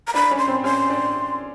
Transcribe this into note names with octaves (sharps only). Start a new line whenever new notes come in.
A#5
D4 B5
C#4
C6
C4
C#4 C6
D4